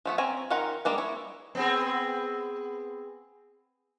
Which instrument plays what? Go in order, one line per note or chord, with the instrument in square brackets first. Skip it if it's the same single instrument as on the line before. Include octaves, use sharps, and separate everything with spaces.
[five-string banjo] F3 A3 B3
C4 C#4 G#5 A#5
D#3 C#4 F4 F#5 A#5
G3 G#3 A#3 D4
E4 C#5
[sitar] B3 C4 G#4